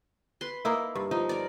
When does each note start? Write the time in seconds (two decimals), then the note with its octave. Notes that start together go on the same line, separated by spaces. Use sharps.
0.41 B4 C6
0.65 A#3 D#4 E4
0.95 G2
1.11 F3 D#4
1.29 A#4 D5